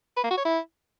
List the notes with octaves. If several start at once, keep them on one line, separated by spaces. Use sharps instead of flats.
B4
A#3
F#4
C#5
E4